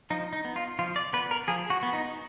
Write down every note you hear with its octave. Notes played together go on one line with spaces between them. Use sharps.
F3 D#4
D#4
B3
F4
F3 F4
D5
B3 B4
A#4
F3 G#4
F#4
B3
D#4